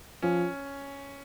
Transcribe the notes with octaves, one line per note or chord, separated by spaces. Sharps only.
F3 C#4